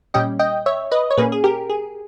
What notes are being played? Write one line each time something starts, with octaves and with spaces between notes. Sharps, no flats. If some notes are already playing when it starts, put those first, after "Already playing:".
A#2 G3 C#4 D#5 G5
D#5 G5
C#5 E5
B4 D#5
C#5
A#2 A#3 C#4 G#4 B4
G#4
G4 A#4
G#4